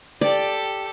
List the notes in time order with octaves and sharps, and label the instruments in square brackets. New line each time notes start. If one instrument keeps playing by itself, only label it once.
[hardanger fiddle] G4 A4 [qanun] D5